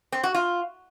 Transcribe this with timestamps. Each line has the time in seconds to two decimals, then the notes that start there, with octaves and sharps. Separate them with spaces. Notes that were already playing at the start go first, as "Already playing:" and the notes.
0.12 C4
0.23 F#4
0.35 F4